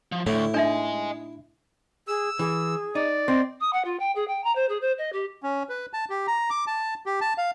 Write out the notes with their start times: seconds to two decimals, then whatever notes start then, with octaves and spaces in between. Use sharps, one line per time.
0.12 F3
0.27 D2 A2 E4
0.54 D4 D#4 D#5 E5 G#5
2.08 G#4 E6
2.39 E3 G#4
2.95 D#4 D5
3.28 C4 D#5
3.61 D#6
3.73 F#5
3.85 F4
4.00 G5
4.15 G#4
4.28 G5
4.44 A#5
4.56 C5
4.69 G#4
4.81 C5
4.98 D#5
5.13 G4
5.43 C#4
5.69 B4
5.93 A5
6.10 G4
6.27 A#5
6.50 D6
6.67 A5
7.06 G4
7.21 A5
7.38 F5